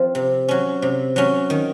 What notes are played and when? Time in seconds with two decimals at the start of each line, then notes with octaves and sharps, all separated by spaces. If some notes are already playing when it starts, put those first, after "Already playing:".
Already playing: F3 C4
0.15 C3
0.48 F#3 C#4
0.82 C3
1.16 F#3 C#4
1.50 D#3